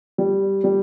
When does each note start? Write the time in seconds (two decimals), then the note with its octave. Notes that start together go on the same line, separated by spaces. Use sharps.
0.18 G3
0.64 G3